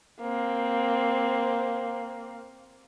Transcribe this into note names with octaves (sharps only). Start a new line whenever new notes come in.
A#3 C4